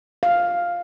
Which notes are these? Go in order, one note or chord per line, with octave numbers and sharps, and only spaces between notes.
F5